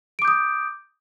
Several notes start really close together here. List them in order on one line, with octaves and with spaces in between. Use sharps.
D7 D6 G6 D#6